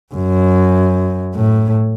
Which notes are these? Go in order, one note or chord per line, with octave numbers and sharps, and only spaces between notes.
F#2
A2